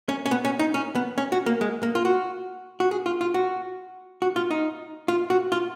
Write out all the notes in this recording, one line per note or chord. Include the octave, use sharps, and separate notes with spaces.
C#4
C#4
B3
C#4
D#4
C#4
B3
C#4
F#4
A#3
G#3
A#3
F4
F#4
F#4
G#4
F4
F4
F#4
F#4
F4
D#4
F4
F#4
F4